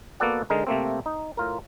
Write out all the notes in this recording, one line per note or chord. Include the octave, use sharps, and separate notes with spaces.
A#3 B3 F#4 A4 D5 F#5
D3 G#3 D#4 A#4
C3 A3 A#3 C4
D#4
A2 F4 A#4